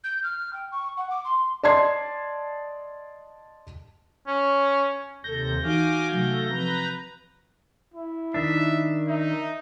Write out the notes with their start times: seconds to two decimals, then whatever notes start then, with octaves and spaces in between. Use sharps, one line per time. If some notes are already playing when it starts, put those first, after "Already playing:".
0.04 G6
0.23 F6
0.53 G5
0.72 C#6
0.97 F#5
1.10 D6
1.25 C6
1.63 D5 D#5 A5 C6 G#6 C7
4.27 C#4
5.24 D#2 C3 A4 G6 A#6
5.63 E3 D#4 F#4 F5 G#5 D6
6.12 C3 F#3 A3
6.49 F3 C4 B4 A#5
7.94 E4
8.34 D#3 D4 E5
9.08 D#4 E5